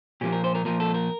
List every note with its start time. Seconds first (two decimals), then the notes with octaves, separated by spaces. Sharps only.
0.21 A#2 F3 A#3 G4
0.32 A#4
0.44 C5
0.55 A#4
0.65 A#2 F3 A#3 A#4
0.80 A4
0.94 A#4